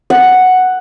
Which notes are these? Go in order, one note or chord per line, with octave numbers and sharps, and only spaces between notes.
F#5